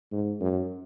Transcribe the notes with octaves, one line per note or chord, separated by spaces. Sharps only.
G#2
F#2